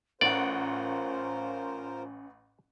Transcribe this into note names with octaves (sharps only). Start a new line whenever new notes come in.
A1 C#4 F4 A#4 C5 D5 F#5